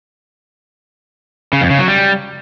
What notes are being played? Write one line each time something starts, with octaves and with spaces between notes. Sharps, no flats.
C#3
F2
C#3
F#3
G3